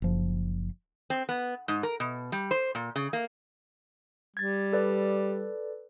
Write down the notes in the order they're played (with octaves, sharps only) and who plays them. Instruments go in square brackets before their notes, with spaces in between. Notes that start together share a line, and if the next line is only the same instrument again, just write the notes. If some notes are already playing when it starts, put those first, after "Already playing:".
[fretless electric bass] F#1 F3
[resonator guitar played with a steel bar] C4
B3
G#2
A#4
B2
G3
C5
A#2
C#3
A#3
[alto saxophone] G3 [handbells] G#6 A6
[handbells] A4 B4 D5